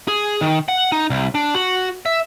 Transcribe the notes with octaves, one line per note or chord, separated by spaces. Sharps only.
G#4
D#3
F#5
D#4
C2
D4
F#4
E5